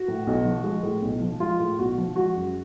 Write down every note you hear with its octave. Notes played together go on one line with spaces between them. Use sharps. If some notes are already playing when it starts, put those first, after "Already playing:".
Already playing: F#4
A2
B1
F3
G#3
A2
B1
F3
G#3 F4
A2
B1 F#4
F3
G#3 F#4
F#2